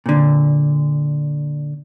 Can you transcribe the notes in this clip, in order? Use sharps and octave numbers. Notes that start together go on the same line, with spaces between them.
A#2 D3